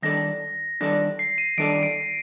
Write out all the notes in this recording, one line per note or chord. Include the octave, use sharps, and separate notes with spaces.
D#3 G3 D4 A4 D5 A#6
D#3 G3 D4 A4 D5 A#6
C7
D#7
D#3 G3 D4 A4 D5 D7
D7